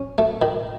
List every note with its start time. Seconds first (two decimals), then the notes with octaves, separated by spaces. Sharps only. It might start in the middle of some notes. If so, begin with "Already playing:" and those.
Already playing: C#4
0.18 A3
0.42 D#3